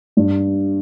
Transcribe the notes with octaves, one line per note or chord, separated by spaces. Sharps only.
G2